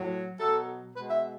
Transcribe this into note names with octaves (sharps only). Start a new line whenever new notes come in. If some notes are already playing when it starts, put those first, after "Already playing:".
Already playing: A2 F#3
B2 F#3 A4
B2 G#3 B4
E5